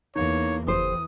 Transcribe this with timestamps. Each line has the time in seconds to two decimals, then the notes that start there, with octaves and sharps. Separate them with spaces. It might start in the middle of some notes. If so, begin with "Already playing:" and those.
0.16 E2 A#3 D#4 C#5
0.67 F#1 E3 G4 C5 D#6